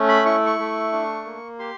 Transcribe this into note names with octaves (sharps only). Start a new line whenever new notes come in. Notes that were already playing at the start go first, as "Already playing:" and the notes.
Already playing: A3 C#4
B5
E4 C#6
C#6
A3
D4
A#3
G4 C6